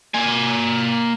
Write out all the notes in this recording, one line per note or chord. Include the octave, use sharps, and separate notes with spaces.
A#3 G#5